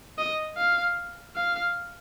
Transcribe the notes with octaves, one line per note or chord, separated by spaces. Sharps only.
D#5
F5
F5